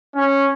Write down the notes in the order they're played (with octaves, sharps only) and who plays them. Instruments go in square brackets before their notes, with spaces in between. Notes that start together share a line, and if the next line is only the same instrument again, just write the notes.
[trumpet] C#4